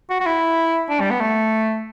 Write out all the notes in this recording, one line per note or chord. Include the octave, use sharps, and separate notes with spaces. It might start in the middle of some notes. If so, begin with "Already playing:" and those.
F#4
F#4
E4
D4
G3
B3
A3